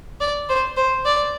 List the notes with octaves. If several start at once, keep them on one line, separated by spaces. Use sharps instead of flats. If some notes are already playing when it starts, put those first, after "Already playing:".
D5
C5
C5
D5